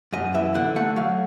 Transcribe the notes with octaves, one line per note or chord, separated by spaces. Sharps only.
F#2 D#5
E3 E5
D3 F#5
A3 F#5
F#3 F5